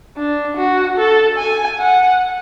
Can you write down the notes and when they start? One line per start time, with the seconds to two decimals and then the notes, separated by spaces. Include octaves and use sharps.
0.17 D4
0.57 F#4
0.98 A4
1.38 G#5
1.80 F#5